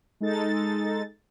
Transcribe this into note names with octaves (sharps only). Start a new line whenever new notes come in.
G#3 D#4 A4 A6